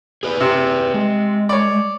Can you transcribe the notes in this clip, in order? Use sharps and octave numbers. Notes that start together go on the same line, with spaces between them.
G#4 B4 D5
C3
G#3
C#5 D5